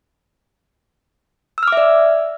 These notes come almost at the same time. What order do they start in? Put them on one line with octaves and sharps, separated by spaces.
E6 F6 D6 E5 D5